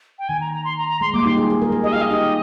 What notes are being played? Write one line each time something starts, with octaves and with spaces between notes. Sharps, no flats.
G5
D#3 G#5
A#5
A#5
C6
A#5
A#5
G#3 C6
G3 A#3 D6
D#4 G4 C6
F4 G#4
F4 G#4
A#4
G#4
G4 D#5
F4 G#4 F5
D#5
D#4 G4